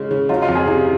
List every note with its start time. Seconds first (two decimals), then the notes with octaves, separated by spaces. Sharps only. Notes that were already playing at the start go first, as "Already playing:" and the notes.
Already playing: C#3 G#3
0.11 C#3
0.29 F#3 F4
0.42 F4
0.48 F2
0.55 G#4
0.67 C3